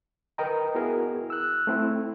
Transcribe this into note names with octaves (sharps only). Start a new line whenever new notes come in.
A#4 B4 D#5 G5 A#5
B3 E4 F#4 G#4 A#4
E6 F#6
A3 C4 E4